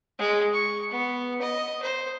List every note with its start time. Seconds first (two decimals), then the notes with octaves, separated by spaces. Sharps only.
0.19 G#3
0.53 C#6
0.91 B3
1.41 D#5
1.82 C5